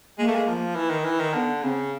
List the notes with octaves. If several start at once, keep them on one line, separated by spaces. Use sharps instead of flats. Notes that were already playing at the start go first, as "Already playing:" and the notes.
G#3 A#3
A3
G#3
F3
E3
D#3
E3
D#3
D3 B3
C#3 C4